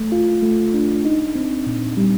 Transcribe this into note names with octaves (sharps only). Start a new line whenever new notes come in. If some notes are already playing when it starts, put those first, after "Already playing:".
Already playing: A3
F4
A3
D4
D#4
C4
A#2
G3